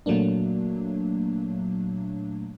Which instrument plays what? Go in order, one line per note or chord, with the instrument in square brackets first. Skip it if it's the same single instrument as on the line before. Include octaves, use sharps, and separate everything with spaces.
[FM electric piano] A#2 F#3 A3 A#3 D4